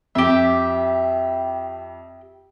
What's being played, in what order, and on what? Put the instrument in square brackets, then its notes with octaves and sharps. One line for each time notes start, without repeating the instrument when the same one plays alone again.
[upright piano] F2 [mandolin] G4 E5